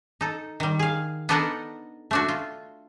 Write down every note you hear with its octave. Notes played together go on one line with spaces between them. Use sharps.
D#4 A4
D#3 G3
G#4 F5
B3 D4 D#4 A4 A#4 F#5
A3 D4 F#4
F4